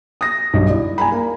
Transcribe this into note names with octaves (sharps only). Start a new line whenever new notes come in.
D#6 A#6
B1 G2 D3
E4 D5
G#5 A#5 B5
A#3